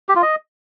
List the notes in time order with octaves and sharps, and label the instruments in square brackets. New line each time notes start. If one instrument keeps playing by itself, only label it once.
[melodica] G4
F4
D#5